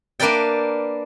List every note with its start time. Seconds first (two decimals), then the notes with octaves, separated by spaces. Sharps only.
0.20 A#3 D4 A#4 B4 D5 G5